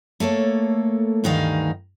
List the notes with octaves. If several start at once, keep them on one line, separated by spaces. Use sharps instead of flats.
A3 A#3 A4 C#5
D2 G2 D#3 E3 D#4 F5